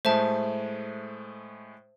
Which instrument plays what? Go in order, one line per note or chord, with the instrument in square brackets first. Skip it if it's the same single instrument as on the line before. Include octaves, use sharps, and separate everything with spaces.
[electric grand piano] A2 G#3 A3 [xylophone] C5 E5 A5